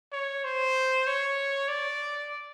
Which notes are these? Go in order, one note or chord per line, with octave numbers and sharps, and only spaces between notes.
C#5
C5
C#5
D5